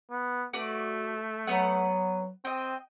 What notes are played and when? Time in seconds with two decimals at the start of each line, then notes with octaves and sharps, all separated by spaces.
0.11 B3
0.53 A3 F#4 B4 D5
1.47 F#3 B3 B4 F#5
2.45 C4 D#5 G5